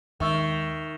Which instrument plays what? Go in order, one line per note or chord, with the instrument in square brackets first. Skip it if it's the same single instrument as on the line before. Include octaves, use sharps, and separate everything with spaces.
[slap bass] D#2 G#3 [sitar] D#3 [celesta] E5 C#6 E6